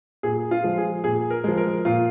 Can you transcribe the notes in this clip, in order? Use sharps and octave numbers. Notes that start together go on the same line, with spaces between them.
A#2 G#4
F4
F3 G#3
G#4
A#2 G#4
A#4
F3 G#3
A#4
A#2 F4